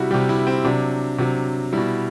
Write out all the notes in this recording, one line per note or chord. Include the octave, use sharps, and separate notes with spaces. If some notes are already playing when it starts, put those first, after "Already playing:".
Already playing: C3 G3 E4 F#4
C3 G3 G4
E4
C4
C3 F#3 D4
C3 F#3
B2 G3 E4